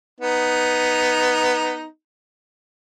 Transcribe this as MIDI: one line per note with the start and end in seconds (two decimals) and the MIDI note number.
0.21 1.84 59
0.21 1.84 63